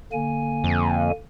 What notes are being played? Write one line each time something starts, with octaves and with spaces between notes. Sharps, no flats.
D3 A#3 G#5
F2